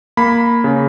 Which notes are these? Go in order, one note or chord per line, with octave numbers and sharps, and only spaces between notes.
A#3 B5
C#3